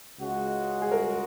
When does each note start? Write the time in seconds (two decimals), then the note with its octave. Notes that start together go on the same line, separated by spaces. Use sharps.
0.18 C#2 C#3 G#3 F#4
0.82 G#4
0.91 A#4